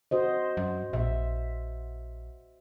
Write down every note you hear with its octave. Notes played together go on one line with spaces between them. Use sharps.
F#4 C5 D#5
F#2
A#1 E5